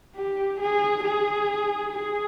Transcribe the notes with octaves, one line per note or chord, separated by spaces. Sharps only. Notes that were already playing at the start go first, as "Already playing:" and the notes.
G4
G#4
G#4
G#4